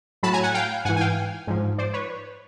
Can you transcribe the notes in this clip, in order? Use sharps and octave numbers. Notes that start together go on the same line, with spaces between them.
A2 F#3 A5 B5
G#5 A#5
F#5 G#5
F5 G5
G#2 E3 F#5 G#5
G#5
F5 G5
G#2 F3
C5 D5
B4 C#5